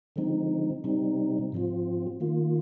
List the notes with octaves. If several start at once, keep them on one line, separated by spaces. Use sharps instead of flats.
D3 F3 G#3 C4 D#4
C3 G3 C4 D#4
G#2 F3 C4 F4
D#3 A#3 F4